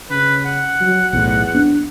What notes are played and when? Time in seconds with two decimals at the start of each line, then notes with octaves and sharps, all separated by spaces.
0.10 C#3 B4
0.45 F#5
0.81 F#3
1.13 B1 E2 A2
1.55 B3 D4